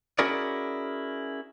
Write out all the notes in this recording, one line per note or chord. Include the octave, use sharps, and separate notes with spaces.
C#4 E4 F#4 G#4 A#4 D5